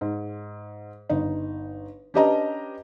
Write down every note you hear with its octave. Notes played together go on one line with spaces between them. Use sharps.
G#2
G1 D#4
C#4 D4 G4 B4 D#5 A#5